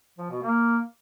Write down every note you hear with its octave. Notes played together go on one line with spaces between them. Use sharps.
F3
B2
A#3